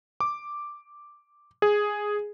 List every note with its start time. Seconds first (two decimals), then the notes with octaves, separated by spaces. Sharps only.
0.20 D6
1.62 G#4